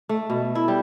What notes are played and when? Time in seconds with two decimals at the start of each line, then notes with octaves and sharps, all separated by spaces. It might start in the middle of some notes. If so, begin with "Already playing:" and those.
0.09 A3
0.30 B2
0.55 E4
0.68 G3